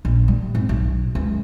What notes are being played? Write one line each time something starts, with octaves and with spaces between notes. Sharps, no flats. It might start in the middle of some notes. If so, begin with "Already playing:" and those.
A#1
G3
G#1
B1
C#2